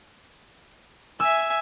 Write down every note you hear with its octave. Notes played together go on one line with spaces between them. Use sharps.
E5 G#5 E6